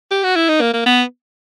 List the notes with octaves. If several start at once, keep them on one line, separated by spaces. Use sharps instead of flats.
G4
F#4
E4
D#4
A#3
A#3
B3